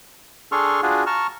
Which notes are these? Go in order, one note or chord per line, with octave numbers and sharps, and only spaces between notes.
D4 G#4 A4 C6 C#6 F6
D4 F4 F#4 G#4
A5 A#5 C#6 F6